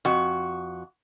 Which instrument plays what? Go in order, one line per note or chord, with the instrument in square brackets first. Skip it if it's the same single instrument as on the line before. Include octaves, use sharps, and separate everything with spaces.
[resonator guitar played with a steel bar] F2 F#4